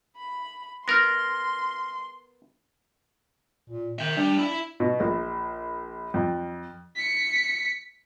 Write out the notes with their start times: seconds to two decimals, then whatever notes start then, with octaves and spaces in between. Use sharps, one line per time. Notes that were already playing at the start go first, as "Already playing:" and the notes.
0.16 B5
0.88 B3 A#4 C6 F6 A#6
3.70 A#2
3.99 D#3 E5 G5
4.17 G3 D4
4.39 E4 E5
4.80 B2
5.00 A#1
6.14 F2
6.96 B6 C#7